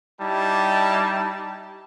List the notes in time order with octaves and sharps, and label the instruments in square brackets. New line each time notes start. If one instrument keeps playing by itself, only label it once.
[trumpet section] G3 D#4 E4 G4 A5